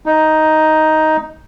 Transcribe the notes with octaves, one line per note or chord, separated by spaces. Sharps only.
D#4